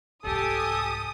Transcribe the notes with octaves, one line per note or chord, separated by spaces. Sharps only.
C2 G#2 G4 A4 G#5 D#6